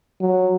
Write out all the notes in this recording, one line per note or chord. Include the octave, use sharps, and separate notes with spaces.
F#3